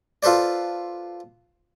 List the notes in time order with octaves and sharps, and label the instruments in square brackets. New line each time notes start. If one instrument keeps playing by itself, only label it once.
[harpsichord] F4 A4 B4 C5 D5